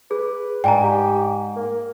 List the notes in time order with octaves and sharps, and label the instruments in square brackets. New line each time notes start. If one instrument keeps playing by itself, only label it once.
[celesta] G#4 [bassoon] B4
[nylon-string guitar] G#2 [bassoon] D4 [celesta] G5 G#5 A#5
[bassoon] G4
A#3